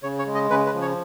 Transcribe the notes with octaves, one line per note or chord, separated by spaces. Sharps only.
C#3 C#5
C#5
G#3
D#5
C#3 B4
B4
F3
C#5